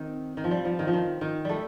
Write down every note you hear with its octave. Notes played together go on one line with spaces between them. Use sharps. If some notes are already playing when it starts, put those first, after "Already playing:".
Already playing: D#3 C4
D#3
F3
G3
F3
D#3
F3
D#3
D#3
G3 A3